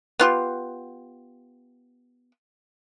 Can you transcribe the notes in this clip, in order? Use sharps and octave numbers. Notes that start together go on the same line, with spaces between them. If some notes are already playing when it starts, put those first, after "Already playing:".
B3 F4 G4